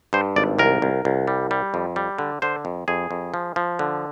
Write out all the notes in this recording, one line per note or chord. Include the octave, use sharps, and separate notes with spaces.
G2 C5
G#1 D5
C2 A#4
C2
C2
G3
G3
F2
G3
D3
D3 C5
F2
F2 G#4
F2
F3
F3
D3